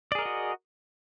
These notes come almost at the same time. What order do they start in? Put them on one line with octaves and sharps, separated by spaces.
D5 G#4 A#4 D#5 F#4